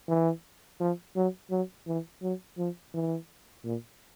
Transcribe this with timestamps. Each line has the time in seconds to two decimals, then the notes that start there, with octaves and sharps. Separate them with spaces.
0.08 E3
0.80 F3
1.16 F#3
1.50 F#3
1.87 E3
2.22 F#3
2.57 F3
2.94 E3
3.65 A#2